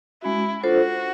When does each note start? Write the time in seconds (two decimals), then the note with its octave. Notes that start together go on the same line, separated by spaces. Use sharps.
0.22 G#3 C#4 E4 F#4
0.63 D4 F4 F#4 A4 C5